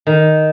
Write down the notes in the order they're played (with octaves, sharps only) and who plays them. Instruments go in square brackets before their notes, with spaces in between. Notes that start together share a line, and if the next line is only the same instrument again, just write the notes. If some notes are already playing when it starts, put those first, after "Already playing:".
[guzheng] D#3